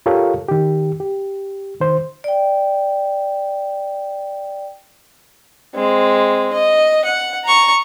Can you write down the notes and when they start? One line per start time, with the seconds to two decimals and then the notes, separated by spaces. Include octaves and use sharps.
0.06 F4 G4 A4 A#4 C#5 F5
0.49 D#3 G4
1.00 G4
1.80 D#3 C5
2.24 D5 G5
5.75 G#3 C4
6.53 D#5
7.05 F#5
7.45 A#5 C#6